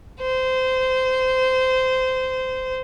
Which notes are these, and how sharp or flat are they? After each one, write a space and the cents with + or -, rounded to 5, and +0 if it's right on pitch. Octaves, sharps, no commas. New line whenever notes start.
C5 -20